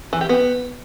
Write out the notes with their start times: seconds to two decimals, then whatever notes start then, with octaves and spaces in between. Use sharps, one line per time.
0.13 E3
0.21 G4
0.29 B3